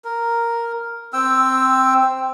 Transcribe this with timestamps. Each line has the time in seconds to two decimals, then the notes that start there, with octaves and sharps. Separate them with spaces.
0.05 A#4
1.13 C4 G5 E6